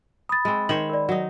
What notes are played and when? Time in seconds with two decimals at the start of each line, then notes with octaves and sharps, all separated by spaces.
0.29 B5 D#6 A6
0.45 G#3 C4
0.69 D#3 C5 C#5 F#7
0.89 A#4 D5
1.09 F#3 D#4